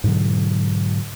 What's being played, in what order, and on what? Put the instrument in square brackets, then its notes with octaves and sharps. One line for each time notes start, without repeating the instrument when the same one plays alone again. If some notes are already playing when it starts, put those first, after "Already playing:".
[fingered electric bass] G#2 B2 D3 F#3